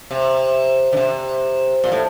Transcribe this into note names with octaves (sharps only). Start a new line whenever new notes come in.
C3
D3
C3
A#2
A2